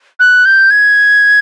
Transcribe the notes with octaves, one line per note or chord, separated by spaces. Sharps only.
F#6
G6
G#6